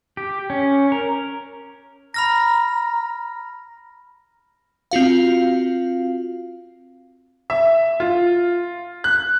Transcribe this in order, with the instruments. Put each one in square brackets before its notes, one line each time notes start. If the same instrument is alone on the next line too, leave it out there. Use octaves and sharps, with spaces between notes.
[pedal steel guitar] G4
C#4
A#4
[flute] A#5 [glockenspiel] B5 F6 A#6
[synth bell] C4 F4 F#4 F5
[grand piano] E5
F4
F#6